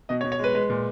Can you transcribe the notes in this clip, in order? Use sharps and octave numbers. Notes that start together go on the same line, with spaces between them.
B2 D#5
C#5
B2
C#5
G#3 B4
G#3 B4
A#2